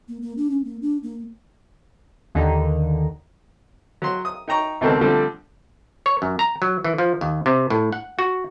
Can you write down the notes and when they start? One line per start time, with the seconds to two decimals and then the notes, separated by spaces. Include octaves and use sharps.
0.08 A#3
0.22 A#3
0.37 D4
0.50 C#4
0.64 A#3
0.82 D4
1.03 A#3
2.35 D#2 D3 D#4
4.02 F#3 C6
4.25 D#6
4.48 D#4 G5 A#5 C#6
4.81 C#2 B2 D#3 C4 A4
5.01 D3 F3 G3 A3 C4 D4
6.06 C#5
6.22 F#2
6.39 A#5
6.62 F#3
6.84 E3
6.98 F3
7.21 D#2
7.46 C3
7.70 A2
7.92 F#5
8.19 F#4